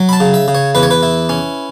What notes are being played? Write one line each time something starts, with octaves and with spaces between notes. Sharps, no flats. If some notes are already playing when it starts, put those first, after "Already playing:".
Already playing: F#3
B5
A5
C#3
E5
C#3
C#5
E2 B4
C#5
B4
E4
C#4